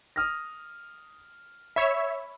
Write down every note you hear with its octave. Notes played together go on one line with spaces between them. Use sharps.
D#6 F6 A#6
C#5 E5 B5